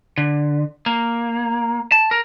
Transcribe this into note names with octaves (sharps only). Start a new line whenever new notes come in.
D3
A#3
A5
A#4